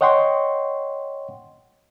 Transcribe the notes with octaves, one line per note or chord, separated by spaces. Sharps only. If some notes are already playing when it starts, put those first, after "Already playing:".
C#5 D#5 F#5 G5 C6 C#6